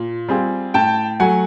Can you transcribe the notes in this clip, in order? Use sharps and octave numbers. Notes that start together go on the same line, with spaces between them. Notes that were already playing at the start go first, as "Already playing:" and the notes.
Already playing: A#2
G3 C4 F4 G#4
A2 G5 A5
F#3 A3 F#5 G#5